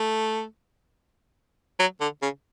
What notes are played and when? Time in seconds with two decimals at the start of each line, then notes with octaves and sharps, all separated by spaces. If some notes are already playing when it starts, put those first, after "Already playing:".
Already playing: A3
1.79 F#3
2.01 D3
2.22 C#3